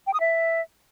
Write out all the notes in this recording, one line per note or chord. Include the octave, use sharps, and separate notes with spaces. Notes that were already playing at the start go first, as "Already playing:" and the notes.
G5
D#6
E5